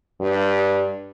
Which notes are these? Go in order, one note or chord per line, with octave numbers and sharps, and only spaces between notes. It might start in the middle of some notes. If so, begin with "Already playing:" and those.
G2